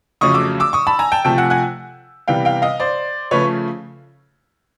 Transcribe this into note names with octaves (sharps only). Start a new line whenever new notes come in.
F2 C#3 F#3 A3 C#4 C#6 D#6
D6 E6
D6 E6
C#6 D#6
A5 B5
G#5 A#5
G5 A5
C3 F3 A3 G5 A5
F#5 G#5
F#5 G#5
C3 E3 G3 B3 F5 G5
F5 G5
D#5 F5
C5 D5
C#3 F3 A3 C#4 B4 C#5